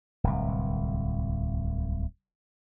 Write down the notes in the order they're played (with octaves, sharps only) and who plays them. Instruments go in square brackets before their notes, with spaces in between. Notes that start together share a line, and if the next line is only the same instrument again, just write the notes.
[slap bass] D1 C2